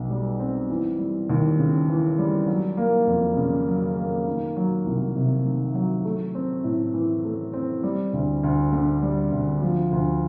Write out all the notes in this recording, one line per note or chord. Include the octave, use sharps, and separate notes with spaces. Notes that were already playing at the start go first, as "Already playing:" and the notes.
Already playing: B1 B2
G3
C4
E3
G3
D#2
C#3
E3
G3
F#3
A#3
F2
C#3
F#3
A#3
D#3
F#3
C2
C3
D#3
F#3
A3
C4
A2
E3
A3
C4
G3
D2
D2
D3
G3
D2
F3
D2